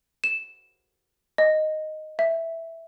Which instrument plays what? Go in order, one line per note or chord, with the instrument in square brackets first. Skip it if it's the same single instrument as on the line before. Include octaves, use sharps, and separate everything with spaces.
[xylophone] E7
D#5
E5